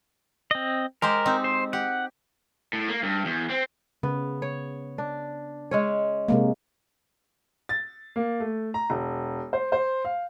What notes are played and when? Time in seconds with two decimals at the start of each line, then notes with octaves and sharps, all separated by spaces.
0.51 C4 D#5
1.02 G#3 G4 A#4 C5
1.26 C4 D#4
1.44 C5
1.73 G4 F#5
2.73 A2
2.88 A#3
3.03 G2
3.25 E2
3.49 C4
4.03 C#3 B3
4.42 C#5
4.98 D4
5.71 G#3 C#4 C#5
6.28 C3 G#3 A#3
7.69 A6
8.16 A#3
8.40 A3
8.74 A#5
8.90 E1
9.53 C5
9.72 C5
10.05 F5